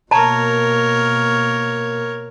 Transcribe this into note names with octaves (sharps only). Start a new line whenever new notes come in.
B2 A#3 A#4 C#5 A5 A#5